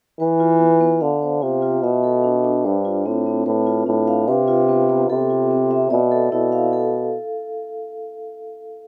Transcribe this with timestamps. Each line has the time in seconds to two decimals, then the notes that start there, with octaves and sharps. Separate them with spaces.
0.20 E3 B4
0.40 F4
0.60 B3
0.80 B3
1.01 D3 F5
1.22 C5
1.42 C3 F4
1.62 F4
1.83 B2 E5
2.04 A4
2.24 D4
2.44 D4
2.65 G2 C5
2.85 F4
3.06 A2 C4
3.26 C4
3.46 A2 B4
3.67 F4
3.86 A2 D4
4.07 F5
4.28 C3 B4
4.48 F4
4.69 B3
4.89 B3
5.10 C3 A4
5.30 F4
5.51 C4
5.71 E5
5.90 B2 D5
6.11 A4
6.32 B2 E4
6.52 F5
6.73 A4